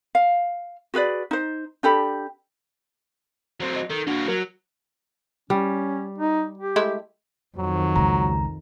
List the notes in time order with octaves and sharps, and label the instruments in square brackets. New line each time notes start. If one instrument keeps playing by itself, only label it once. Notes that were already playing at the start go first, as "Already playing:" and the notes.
[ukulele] F5
F#4 G#4 B4 D5
D#4 C5
D4 G4 A4 B5
[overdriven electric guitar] F#3 C4
[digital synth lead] D#5
[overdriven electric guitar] D#3 [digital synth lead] A4
[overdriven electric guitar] A#3 F#4 [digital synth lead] D4
[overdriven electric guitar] F#3 [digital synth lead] A#4
[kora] G3 [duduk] C#4
[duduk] D#4
G4
[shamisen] G#3 A3 E4
[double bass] F2 D#3 [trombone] F#3
[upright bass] C#2 [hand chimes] A#5